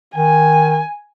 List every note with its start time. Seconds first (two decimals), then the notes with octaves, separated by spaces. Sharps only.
0.16 D#3 G#5